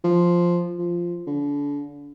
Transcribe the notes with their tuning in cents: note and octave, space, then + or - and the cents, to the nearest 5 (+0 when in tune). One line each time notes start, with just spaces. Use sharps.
F3 +0
F3 -5
D3 -35